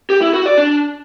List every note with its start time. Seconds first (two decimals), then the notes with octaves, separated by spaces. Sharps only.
0.10 G4
0.22 E4
0.34 F#4
0.46 D5
0.58 D4